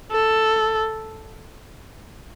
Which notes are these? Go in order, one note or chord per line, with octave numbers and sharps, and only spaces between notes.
A4